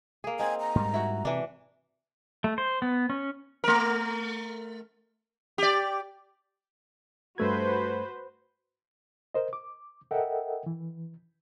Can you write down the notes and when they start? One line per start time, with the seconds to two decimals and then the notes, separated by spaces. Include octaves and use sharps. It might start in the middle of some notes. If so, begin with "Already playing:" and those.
0.24 A#3 G#4
0.39 C4 D#4 G#5
0.60 A#5
0.76 G#2 G3
0.94 E4 F#4
1.25 C3 E3 D4
2.44 A3
2.58 C5
2.82 B3
3.10 C#4
3.64 A3 A#4
5.58 G4 D5
7.38 G2 A3 F#4 B4 C5 G#6
9.34 A#4 C5 D#5
9.53 D6
10.11 A4 A#4 D#5 E5 F#5 G5
10.66 E3